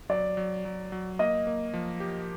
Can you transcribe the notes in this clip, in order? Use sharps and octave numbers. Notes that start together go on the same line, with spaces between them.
F#3 D5
F#3
F#3
F#3
A#3 D#5
A#3
F3
G4